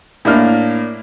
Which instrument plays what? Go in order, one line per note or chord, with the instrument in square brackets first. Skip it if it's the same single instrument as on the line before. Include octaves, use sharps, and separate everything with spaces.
[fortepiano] A2 A#3 D4 F6